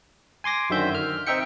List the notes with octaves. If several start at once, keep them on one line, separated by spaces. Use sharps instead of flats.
G#5 C6 D6 A#6
F#2 D3 D#3 C5 E5 G6
F6
C4 D#4 E5 G5 C#7